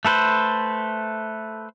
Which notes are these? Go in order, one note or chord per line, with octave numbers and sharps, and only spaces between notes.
A3 A4 B4 C5